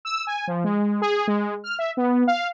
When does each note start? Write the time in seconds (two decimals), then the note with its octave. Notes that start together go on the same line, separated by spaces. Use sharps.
0.05 E6
0.27 G#5
0.47 F3
0.64 G#3
1.02 G#4
1.28 G#3
1.64 F6
1.79 E5
1.97 B3
2.27 F5